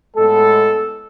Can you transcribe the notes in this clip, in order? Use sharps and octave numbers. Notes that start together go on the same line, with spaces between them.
A2 G#3 B3 A4